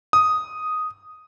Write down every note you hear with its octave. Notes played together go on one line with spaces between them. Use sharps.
D#6